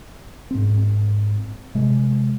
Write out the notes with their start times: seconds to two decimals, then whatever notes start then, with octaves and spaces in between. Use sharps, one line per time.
0.51 G#2 C4
1.75 C3 G#3